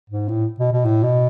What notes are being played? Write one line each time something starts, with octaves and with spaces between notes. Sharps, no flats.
G#2
A2
B2
B2
A2
B2